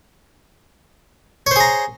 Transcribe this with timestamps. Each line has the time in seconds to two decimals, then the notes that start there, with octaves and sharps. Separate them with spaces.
1.47 C#5
1.51 C5
1.56 G#4
1.60 A#5